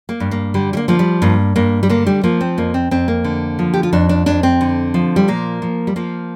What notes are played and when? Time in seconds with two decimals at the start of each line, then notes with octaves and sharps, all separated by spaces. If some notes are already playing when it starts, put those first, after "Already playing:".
0.09 A#3
0.20 G2
0.31 A#3
0.54 D3 G3
0.73 G3
0.77 A#3
0.88 F3 A#3
0.99 G3
1.22 G2 A#3
1.56 G2 A#3
1.83 G3
1.90 D3 A#3
2.07 G3
2.23 F3 A#3
2.41 C4
2.58 F2 A#3
2.74 C4
2.91 F2 C4
3.08 A#3
3.24 D3
3.59 F3
3.74 G4
3.83 F4
3.93 F2 D4
4.09 D4
4.26 F2 D4
4.43 C4
4.61 D3
4.94 F3
5.16 G3
5.28 A#2 A#3
5.62 F3
5.87 G3
5.96 F3 A#3